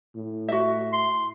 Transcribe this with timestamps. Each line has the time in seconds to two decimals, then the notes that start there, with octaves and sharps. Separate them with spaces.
0.16 A2
0.49 F#4 E5
0.93 C6